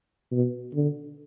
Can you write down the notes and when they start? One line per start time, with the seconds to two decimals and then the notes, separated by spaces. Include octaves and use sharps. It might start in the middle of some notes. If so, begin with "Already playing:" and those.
0.31 B2
0.74 D3